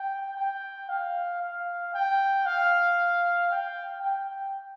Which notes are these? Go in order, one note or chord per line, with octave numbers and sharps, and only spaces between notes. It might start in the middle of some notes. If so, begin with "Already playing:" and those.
Already playing: G5
G5
F5
F5
G5
F5
G5
G5